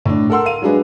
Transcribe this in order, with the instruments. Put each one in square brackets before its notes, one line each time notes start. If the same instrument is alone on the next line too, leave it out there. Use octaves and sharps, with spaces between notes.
[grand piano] A2 D4
A4 A#4 F#5 C6 E6
F5 D#7
F#3 G#3 D4 G#4 B4